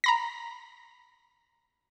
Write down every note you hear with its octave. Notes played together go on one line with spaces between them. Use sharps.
A#5 B5 A#6